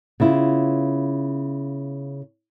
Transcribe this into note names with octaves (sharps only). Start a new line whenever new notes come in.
C#3 B3 E4 F4